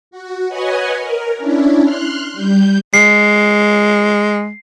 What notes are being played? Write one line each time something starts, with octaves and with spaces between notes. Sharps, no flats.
F#4
B4 C#5 D#5 F#5 G#5
A#4
C#4 D4 E4
C6 F6 F#6
G3 G6
G#3 C7